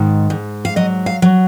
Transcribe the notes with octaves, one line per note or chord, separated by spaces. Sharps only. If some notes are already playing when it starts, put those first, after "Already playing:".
Already playing: G#2 D#3
G#2
F5
F#3 D#5
F5
F#3